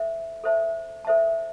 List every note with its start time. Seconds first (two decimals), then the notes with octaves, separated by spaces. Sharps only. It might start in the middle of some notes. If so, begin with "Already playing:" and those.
Already playing: A4 C5 E5
0.44 A4 C5 E5 A5
1.05 A4 C5 E5 A5